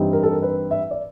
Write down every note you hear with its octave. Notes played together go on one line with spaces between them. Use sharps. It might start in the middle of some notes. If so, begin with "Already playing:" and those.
Already playing: G2 E3 G3 C4 D#4
A#4
A4
A#4
B4
E5
D5